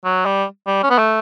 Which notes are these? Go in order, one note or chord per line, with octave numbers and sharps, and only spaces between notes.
F#3
G3
G3
C#4
B3
A3